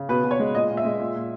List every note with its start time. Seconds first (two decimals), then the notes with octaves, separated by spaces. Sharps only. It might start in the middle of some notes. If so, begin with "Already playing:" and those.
Already playing: C#3
0.09 B2 B4
0.24 B2
0.31 C#5
0.39 G#3
0.54 A#2 D#5
0.70 A#2
0.77 E5
0.85 G#3
1.00 A#2
1.15 A#2